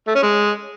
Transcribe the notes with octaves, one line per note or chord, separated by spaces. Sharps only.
A3
C#4
G#3